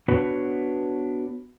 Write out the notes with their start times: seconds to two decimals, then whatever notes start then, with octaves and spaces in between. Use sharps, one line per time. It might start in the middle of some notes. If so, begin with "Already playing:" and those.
0.08 B3 D4 F#4 B4 C#5